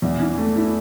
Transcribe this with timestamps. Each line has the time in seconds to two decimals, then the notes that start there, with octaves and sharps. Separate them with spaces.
0.02 E2
0.20 E3
0.38 A3
0.56 E4